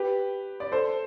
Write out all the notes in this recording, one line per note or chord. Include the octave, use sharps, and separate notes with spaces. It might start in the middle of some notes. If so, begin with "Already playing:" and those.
Already playing: G4 B4
D5
A4 C5